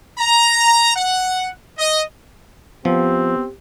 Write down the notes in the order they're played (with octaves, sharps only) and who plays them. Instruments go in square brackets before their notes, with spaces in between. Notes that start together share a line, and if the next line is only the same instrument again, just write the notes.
[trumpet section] A#5
F#5
D#5
[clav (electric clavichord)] F3 [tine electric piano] B3 [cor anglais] C4 [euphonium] G4